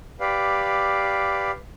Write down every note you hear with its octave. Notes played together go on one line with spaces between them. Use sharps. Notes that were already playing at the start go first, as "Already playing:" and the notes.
G4 B4 D5 F5